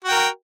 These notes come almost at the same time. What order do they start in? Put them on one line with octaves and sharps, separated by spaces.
F#4 G5 A#4